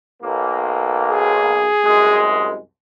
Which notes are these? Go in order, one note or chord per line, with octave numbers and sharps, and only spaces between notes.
B1 A#3
G#4
C2 F#2 G#3